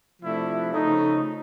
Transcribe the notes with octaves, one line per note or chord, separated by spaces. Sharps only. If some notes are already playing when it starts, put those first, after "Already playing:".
C3 F3 A3 D4 E4
C#3 F3 A3 D#4